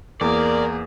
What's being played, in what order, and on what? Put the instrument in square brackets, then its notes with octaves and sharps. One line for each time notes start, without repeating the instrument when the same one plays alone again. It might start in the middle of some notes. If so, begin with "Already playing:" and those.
[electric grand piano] E2 [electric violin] A#3 G#4 [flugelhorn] A#4 [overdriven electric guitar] D5